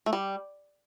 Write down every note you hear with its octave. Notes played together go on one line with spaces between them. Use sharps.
A3
G3